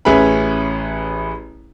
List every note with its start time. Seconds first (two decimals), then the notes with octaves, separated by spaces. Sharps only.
0.05 A1 C#4 G#4 B4 E5 B5